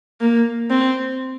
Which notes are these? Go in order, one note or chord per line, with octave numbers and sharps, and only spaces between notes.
A#3
C4